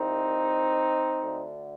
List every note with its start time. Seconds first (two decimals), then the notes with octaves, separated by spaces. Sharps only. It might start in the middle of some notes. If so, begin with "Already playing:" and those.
Already playing: C2 A#2 C4 D#4
1.22 D2 D3